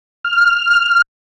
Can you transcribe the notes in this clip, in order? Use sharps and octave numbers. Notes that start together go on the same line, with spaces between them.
F6